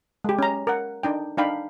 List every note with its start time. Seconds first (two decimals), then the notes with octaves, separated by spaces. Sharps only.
0.24 G#3 G4
0.39 C#4 A#5
0.67 A#4 F#5
1.03 D4 D#4 G5
1.37 D4 D#4 F5 G5 B5